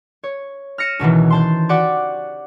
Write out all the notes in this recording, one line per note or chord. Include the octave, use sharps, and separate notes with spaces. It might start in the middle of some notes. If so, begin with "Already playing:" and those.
C#5
F6 A#6 C#7 D#7 E7
C#2 B2 D#3 E3
C5 A5 C6
F#4 G4 D5 F#5 D6